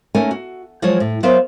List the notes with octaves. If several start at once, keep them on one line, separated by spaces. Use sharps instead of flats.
A3 A#3 C#4 D#4 A#4 G#5
F#4
F3 F#3 G#3 F4 C5 C#5
A2
F#3 B3 A#4 C5 E5 F5